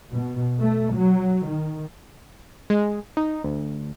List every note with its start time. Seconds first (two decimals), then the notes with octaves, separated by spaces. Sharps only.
0.13 B2
0.63 A3
0.95 F#3
1.50 D#3
2.70 G#3
3.17 D#4
3.44 D2